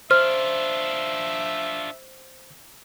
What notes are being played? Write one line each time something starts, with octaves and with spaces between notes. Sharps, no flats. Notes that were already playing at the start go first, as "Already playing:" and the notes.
D4 F4 C5 E5 F6